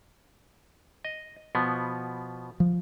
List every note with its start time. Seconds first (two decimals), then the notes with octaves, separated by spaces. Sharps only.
1.05 D#5
1.55 B2 F3 B3
2.60 F3